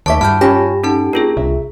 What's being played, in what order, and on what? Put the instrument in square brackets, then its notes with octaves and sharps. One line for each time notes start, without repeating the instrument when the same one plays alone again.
[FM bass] D#2 [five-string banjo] A3 E5 [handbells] A5 D6 B6
[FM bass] G2 [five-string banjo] E4 F#4 [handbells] A5 F6 G6
[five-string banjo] C#4 F4 [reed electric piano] G4 [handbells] B5 A#6
[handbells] C#4 D#4 A5 [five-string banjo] A4
[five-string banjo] A#3 [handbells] D4 F4 G#4
[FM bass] C2 [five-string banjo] E5